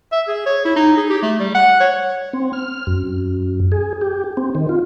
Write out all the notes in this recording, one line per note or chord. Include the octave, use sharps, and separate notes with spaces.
E5
G#4
C#5
E4
D#4
G#4
G4
A3
G3
F#5
C#5
C4
F6
F#2
G#4
G4
C4
D#3
F4